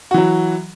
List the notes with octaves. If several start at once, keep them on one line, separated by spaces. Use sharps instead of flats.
E3 F#3 F#4